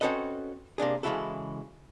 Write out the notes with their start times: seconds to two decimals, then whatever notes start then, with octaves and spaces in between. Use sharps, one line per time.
0.01 C4 C#4 F#4 A4 B4 D#5
0.78 C3 A#3 D4 G#4
1.03 C#3 E3 G#3 E4 F#4 A4